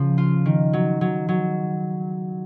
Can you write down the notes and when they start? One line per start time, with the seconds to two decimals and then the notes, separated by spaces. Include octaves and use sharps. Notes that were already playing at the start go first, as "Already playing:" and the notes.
Already playing: C#3 F3
0.18 F4
0.46 D#3
0.73 F#3
1.01 F#3
1.29 F#3